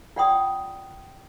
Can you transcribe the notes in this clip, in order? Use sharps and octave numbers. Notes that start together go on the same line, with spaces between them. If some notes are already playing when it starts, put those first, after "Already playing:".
F4 D5 F#5 G5 C6 D#6